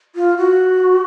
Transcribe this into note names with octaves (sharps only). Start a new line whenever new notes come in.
F4
F#4